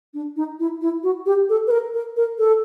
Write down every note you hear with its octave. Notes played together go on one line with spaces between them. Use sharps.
D4
D#4
E4
E4
F#4
G4
A4
B4
A#4
A#4
A#4
A4